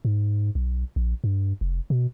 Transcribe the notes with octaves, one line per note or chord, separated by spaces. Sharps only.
G#2
B1
A#1
G2
F1
B2